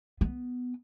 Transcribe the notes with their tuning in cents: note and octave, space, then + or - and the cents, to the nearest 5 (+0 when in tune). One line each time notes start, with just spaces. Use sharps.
B3 +5